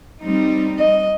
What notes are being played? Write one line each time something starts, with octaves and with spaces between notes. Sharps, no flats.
G3 C4 D#4
D#5